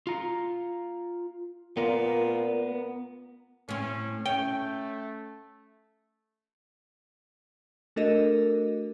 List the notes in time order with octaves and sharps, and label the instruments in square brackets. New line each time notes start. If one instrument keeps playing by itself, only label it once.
[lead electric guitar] F4 A#5
[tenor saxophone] A#2 [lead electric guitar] B3 A#4
[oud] A2 C4 [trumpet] C#4
[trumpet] A3 [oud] C#4 [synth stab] G5
[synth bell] A3 D4 F#4 A4 A#4 D#5